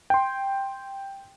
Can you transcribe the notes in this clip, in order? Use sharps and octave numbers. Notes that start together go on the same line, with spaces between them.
G5 C6